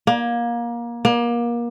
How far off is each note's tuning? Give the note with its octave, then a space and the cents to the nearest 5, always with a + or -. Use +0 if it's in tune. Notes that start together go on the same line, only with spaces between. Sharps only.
A#3 +25
A#3 +30